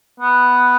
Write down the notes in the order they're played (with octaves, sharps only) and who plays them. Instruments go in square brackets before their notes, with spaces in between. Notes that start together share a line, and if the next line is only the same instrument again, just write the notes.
[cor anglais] B3